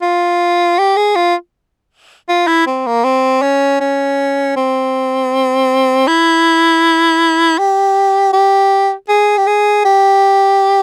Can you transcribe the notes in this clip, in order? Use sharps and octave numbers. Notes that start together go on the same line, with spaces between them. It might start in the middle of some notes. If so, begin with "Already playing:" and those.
F4
G4
G#4
F4
F4
E4
C4
A#3
C4
C#4
C#4
C4
E4
G4
G4
G#4
G4
G#4
G4